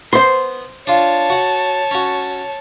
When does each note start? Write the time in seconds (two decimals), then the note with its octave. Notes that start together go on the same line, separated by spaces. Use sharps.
0.13 B3 C5 C6
0.87 D4 F4 C#5 A5
1.30 F#4 F#5
1.91 C#4 F#4